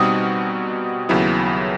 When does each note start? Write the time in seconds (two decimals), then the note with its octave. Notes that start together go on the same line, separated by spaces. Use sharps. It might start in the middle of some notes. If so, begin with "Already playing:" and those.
Already playing: B2 G3 C4 D#4 F#4 D#6
1.09 D#2 C#3 F#3 B3 E4